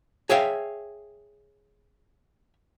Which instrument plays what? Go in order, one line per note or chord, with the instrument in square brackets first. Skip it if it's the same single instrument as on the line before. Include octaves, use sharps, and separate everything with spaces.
[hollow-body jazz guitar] G#4 C#5 E5 F5 G5